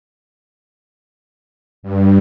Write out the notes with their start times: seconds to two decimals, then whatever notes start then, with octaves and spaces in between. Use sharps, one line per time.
1.83 G2